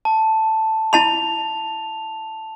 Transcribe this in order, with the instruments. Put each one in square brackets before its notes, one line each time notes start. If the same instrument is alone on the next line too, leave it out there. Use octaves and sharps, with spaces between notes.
[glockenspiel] A5
[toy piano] E4 A5 C6 [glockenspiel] F7